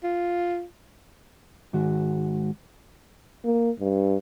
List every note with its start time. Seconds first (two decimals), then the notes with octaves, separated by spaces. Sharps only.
0.04 F4
1.73 G#2 D#3 G#3 F#4
3.45 A#3
3.80 G2